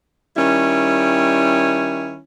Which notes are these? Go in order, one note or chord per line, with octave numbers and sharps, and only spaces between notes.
D#3 G3 C#4 E4